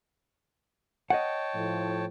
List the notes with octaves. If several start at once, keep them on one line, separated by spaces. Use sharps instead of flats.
C#5 D#5 F#5 G5 A5
A2 F3